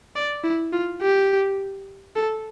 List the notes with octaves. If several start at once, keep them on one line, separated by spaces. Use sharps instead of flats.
D5
E4
F4
G4
A4